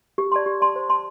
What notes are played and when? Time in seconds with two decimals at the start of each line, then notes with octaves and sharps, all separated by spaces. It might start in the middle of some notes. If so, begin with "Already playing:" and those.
0.18 G4
0.32 D5 A5 C6
0.46 G4
0.61 D5 A5 C6
0.76 C5
0.89 A5 C6